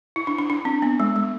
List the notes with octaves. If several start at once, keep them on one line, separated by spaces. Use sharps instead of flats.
E4
D4
D4
D4
C4
B3
G#3
G#3